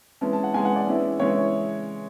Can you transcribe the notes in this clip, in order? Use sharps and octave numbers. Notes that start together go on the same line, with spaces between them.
E3 G#3 C#4 A5
A5
F#5
E3 G#3 C#4 G#5
F#5
D5
E3 G#3 C#4 E4
E3 G#3 C#4 E4 C#5